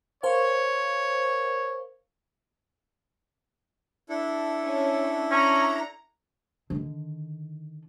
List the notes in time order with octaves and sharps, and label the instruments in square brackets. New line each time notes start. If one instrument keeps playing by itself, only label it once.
[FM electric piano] A#4 C5 F5 [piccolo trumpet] C#5
[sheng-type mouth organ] D4 E4 A4
[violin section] C#4
[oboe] C#4 [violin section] A#5
[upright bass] D3 D#3